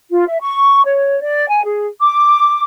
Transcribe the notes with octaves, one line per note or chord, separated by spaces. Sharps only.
F4
E5
C#6
C#5
D5
G#5
G#4
D6